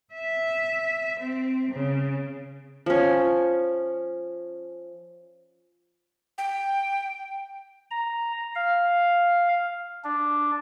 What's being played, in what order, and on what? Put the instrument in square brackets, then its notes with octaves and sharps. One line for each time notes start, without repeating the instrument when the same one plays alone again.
[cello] E5
C4
C#3
[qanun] F3 C#4
[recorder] G5
[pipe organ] A#5
F5
D4